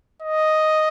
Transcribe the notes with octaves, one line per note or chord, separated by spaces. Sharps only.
D#5